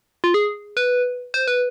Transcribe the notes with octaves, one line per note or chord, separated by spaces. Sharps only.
F4
G#4
B4
C5
B4